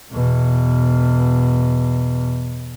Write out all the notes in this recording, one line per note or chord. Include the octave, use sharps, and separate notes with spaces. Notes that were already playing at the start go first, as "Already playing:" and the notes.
E2 B2